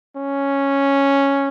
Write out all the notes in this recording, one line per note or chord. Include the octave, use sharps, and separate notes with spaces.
C#4